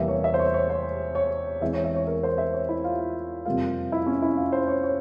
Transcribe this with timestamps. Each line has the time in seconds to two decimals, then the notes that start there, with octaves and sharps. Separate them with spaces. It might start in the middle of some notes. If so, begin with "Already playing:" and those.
Already playing: E2 C3 G3 A#3 E5
0.08 C#5
0.24 E5
0.34 C5
0.39 C#5
0.54 C#5
0.70 C5
1.15 C#5
1.61 E2 E3 G#3 C4 E5
1.73 C#5
1.85 E5
1.96 C#5
2.07 A#4
2.23 C5
2.38 E5
2.54 C#5
2.69 E4
2.84 F4
3.00 F4
3.45 F2 C3 G3 A#3 F4
3.92 E4
4.06 C#4
4.22 E4
4.37 F4
4.52 C5
4.68 C#5
4.83 C#5